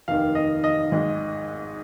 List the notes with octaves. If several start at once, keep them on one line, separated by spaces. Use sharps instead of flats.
F1 D#2 D#3 F5
D#5
D#5
G#1 G#2 G#3